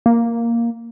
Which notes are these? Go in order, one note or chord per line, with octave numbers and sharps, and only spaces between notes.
A#3